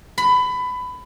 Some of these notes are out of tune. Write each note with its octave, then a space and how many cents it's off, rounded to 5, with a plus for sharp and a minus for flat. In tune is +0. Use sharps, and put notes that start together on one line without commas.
B5 +20